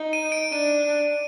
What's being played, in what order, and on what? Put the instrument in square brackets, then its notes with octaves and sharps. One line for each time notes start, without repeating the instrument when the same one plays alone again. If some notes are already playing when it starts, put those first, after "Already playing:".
Already playing: [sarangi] D#4
[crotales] D#7
D7
[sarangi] D4 [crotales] D#7